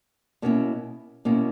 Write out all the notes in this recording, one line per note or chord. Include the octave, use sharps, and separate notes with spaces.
B2 A#3 C#4 E4
B2 A#3 C#4 E4